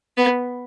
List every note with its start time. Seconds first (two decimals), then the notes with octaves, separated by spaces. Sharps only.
0.18 B3